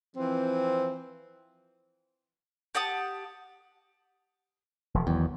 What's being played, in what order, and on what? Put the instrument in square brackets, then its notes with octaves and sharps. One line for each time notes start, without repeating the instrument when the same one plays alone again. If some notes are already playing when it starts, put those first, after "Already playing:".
[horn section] E3 F3 C4
[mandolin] G4 F#5 A5 D#6
[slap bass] E1 F3
[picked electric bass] E2 [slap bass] D#3 F#3